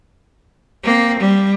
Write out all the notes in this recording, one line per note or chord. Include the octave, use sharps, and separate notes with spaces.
A#3 C4
G3